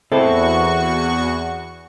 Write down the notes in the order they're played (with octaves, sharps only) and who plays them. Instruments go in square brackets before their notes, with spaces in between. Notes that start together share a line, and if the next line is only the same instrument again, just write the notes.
[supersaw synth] E2 F#4 C#6 [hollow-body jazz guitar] C4 E4 A4